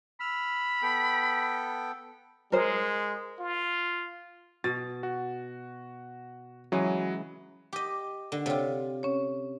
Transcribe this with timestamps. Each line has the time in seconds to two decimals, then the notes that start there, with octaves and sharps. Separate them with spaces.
0.20 B5 E6 F6
0.82 B3 A4 G5
2.52 G#3 A#4 C5
3.39 F4
4.64 B2 A6
5.03 F#4
6.72 C#3 E3 F#3 G#3
7.73 G4 D#5 D6
8.32 D3
8.46 C3 F4 A4 C#5 G5
9.03 C#4 C#5